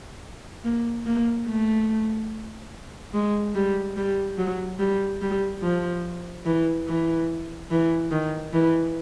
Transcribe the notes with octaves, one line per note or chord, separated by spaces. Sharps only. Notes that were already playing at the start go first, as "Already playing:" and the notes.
A#3
A#3
A3
G#3
G3
G3
F#3
G3
G3
F3
E3
E3
E3
D#3
E3